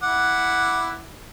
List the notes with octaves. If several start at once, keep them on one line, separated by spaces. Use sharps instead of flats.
E4 F#5 D6